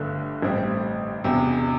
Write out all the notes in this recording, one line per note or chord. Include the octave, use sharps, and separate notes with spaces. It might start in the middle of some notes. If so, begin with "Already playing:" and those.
Already playing: G1 G2 D3 A3 D4
A1 A2 G3 C4
E1 E2 C3